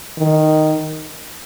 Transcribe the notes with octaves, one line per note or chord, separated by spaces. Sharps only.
D#3